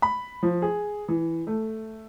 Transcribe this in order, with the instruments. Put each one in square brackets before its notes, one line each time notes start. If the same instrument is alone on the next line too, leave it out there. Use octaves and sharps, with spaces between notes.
[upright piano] B5
F3
G#4
E3
A3